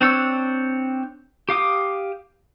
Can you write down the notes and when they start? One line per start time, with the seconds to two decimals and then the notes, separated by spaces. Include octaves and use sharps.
0.01 C4 D4 C#5 E6
1.49 G4 F5 D6 D#6